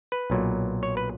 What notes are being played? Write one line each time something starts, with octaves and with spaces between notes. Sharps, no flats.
B4
B1 A#2 F#3
C#5
B4